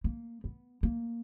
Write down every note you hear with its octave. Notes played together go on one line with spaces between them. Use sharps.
A#3
B3
A#3